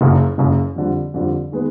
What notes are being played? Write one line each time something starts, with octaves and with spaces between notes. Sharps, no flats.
F#1 F#2 C#3
F#1 F#2 C#3
F2 D3 G3
F2 D3 G3
D#3 G#3 B3